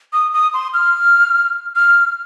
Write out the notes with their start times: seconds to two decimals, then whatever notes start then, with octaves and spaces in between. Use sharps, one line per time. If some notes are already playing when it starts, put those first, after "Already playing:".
0.13 D#6
0.33 D#6
0.54 C6
0.74 F6
1.76 F6